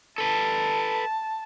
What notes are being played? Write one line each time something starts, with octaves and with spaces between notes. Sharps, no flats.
A4 B4 A5